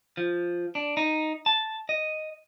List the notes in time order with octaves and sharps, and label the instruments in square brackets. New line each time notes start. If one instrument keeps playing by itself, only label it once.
[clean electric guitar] F3
D4
D#4
A5
D#5